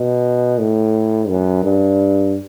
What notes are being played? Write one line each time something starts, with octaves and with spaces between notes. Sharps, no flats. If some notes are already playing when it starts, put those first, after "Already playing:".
Already playing: B2
A2
F#2
G2